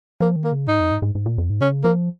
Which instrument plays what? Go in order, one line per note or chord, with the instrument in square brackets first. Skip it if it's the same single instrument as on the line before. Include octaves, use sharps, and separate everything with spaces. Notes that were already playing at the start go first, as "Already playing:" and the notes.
[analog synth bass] F3 [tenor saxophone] A#3
[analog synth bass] D#3
[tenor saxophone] A#3
[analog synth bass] C#3
[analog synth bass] G#2 [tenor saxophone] D#4
[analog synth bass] F2
G#2
G#2
G#2
A#2
F2
G#2
[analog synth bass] C#3 [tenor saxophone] C#4
[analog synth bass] F3 [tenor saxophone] A#3